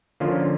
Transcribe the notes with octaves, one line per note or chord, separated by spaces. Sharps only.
D3 F3 A#3 C#4 F4